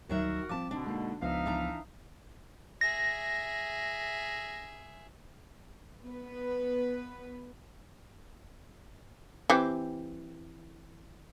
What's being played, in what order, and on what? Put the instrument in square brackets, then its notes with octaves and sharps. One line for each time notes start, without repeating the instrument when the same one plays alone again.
[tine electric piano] D2 [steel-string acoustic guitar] D#3 F#3 E5 [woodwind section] F#4 A#4
[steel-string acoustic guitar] F3 A5 [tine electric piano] C4 D6
[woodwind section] B2 D3 [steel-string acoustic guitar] D4
[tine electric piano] G#3 A#3 D#4
[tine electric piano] C#2 F3 B3 [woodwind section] D#4 E5 F5
[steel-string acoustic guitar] E3 D4 A#5
[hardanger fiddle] G#4 E5 [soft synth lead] A#6
[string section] B3 B4
[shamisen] E3 C4 G4